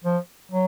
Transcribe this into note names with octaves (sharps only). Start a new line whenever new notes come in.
F3
F#3